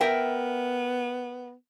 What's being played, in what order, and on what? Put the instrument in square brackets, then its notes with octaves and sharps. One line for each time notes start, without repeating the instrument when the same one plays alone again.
[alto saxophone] B3 [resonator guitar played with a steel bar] A#4 E5 G5